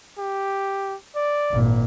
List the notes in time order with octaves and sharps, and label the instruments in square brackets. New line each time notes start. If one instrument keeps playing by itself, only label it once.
[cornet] G4
D5
[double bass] G#1 A#2